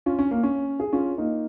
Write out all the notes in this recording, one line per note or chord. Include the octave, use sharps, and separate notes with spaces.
C#4 F4
C#4
A#3
C#4
G#4
C#4 F4
A#3 D#4